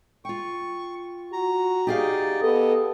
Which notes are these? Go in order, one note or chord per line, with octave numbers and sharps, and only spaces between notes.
F4 G5 C#6
F#4 A#5
D#4 G4 G#4 D5 D#5 F5
B3 A4 D#5